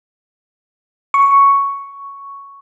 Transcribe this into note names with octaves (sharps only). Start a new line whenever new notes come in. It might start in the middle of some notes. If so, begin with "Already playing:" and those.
C#6